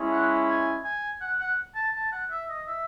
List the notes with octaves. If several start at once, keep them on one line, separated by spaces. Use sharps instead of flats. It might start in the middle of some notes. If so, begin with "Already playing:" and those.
Already playing: G#3 C#4 E4
F#5
G#5
G#5
F#5
F#5
A5
A5
F#5
E5
D#5
E5